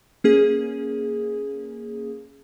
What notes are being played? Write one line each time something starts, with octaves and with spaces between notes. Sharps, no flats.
A#3 C#4 G#4